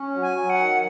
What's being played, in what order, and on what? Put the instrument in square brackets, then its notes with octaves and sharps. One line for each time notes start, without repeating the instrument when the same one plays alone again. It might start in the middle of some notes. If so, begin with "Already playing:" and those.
Already playing: [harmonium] C#4
F#3
[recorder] G#5
[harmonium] F#3
[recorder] F#5
[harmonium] D#3